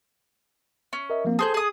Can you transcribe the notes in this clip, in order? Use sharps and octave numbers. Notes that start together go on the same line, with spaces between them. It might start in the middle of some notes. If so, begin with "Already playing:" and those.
C#4
A#4 D#5 E5
F3 A#3 C4
G#4 A4 C5 A5 G6
G#4 D#6